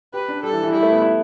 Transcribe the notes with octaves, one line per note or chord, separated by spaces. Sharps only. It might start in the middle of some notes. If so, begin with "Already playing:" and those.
G4 B4
D4
G3 A4
E3
E3
G3 E4
A3
B3
E4